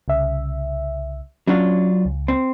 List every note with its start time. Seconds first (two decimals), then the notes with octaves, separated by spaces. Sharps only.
0.08 C2 C#3 E5
1.47 F#3 C#4 D4 F4
2.05 C#2
2.28 C4